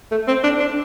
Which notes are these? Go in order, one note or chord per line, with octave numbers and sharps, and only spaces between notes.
A3
C4
D4
D4